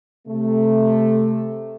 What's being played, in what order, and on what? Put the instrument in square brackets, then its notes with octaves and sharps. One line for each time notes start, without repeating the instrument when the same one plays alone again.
[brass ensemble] C3 A3